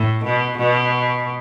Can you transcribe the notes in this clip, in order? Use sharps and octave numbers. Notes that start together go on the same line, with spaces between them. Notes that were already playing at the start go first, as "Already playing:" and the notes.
Already playing: A2
B2
B2